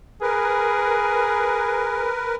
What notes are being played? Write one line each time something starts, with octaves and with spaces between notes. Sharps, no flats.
G#4 A#4 B4